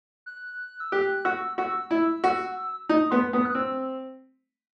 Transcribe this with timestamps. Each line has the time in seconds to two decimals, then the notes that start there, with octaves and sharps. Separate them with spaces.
0.26 F#6
0.80 E6
0.92 G4 F#6
1.25 F#4 E6
1.58 F#4 E6
1.91 E4
2.24 F#4
2.89 D#4 D#6
3.11 B3 C6
3.33 B3 D#6
3.45 F#6
3.55 C4 E6